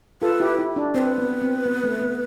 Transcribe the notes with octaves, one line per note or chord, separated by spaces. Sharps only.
F4 A4 B4
E4 G4
E4
D4
C4 C5
B4
B3
C4
B3
A3
B3